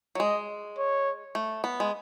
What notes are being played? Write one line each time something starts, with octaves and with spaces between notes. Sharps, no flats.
F#3
G#3 D#5
C#5
A3
B3
G#3